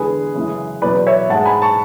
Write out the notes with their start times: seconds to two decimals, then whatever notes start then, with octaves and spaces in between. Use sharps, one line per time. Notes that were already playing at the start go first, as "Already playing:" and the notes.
Already playing: E2 D3 G#3 G#4 B4
0.34 F#2 C#3 E3 G#3
0.82 E2 B2 F#3 B4 D5
1.07 C#5 E5
1.30 G#2 G#3 F#5 A5
1.46 G#5 B5
1.62 A5 C#6